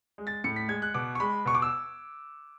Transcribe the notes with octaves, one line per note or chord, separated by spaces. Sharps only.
G#3
A6
A2 C#7
B6
G#3 G#6
F#6
B2 D6
C#6
G#3 B5
B2 C#6
D6
E6